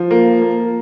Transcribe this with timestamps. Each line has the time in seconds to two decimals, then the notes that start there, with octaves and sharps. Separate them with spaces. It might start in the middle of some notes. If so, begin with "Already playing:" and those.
Already playing: F3
0.11 A#3
0.41 A#3